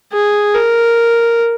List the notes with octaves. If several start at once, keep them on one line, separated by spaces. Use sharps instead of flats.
G#4
A#4